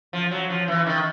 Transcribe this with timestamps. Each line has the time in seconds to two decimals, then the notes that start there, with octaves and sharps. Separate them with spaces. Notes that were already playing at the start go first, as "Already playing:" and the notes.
0.13 F3
0.31 F#3
0.50 F3
0.68 E3
0.86 D#3